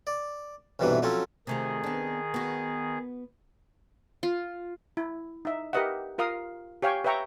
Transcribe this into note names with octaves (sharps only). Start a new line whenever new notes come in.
D5
B1 G2 C3 E3 F#3 B4
F3 F#3 C4 C#4 A4
C3 D#3 A3 F4 G#4
B3 D4
B3 F#4
F4
E4
D#4 E5
G4 A#4 B4 D#5 E5 F#5
F4 A#4 F5 D#6
G4 C#5 F5 G5 G#5 C#6
B4 C#5 E5 G5 A#5 C#6